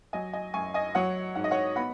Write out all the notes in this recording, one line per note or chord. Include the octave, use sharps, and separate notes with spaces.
F#3 D#5 G#5
D#5 G#5
F#2 G#5 C#6
D#5 G#5
F#3 C#5 F#5
G#2 F#5
D#5
C#5 F#5
B3 F#5 B5